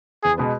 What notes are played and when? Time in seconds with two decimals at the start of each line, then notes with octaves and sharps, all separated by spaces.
0.24 E2 G#4
0.38 B2 G#3 B3